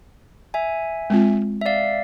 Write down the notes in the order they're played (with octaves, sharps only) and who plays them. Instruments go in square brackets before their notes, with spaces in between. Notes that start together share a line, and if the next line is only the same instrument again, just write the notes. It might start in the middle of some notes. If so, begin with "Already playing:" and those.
[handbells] E5 G#5
[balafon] G#3 C4 F4
[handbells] E5
D5 F5